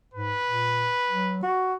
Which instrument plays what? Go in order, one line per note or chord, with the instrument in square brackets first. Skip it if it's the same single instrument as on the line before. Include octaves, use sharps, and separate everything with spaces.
[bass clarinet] G#2 [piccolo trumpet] B4
[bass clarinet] A#2
F#3
F#4